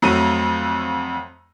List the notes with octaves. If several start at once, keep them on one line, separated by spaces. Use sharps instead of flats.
F2 F#3 A3 A#5 D#7